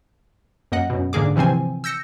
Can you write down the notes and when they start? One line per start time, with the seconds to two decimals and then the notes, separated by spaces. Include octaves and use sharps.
0.72 F#2 A#3 D#5 F#5
0.90 F#2 B2
1.13 G#2 D3 A#3 G#4 D6
1.36 C3 E3 F3 C4 G#5
1.84 E6 G6 A#6 C#7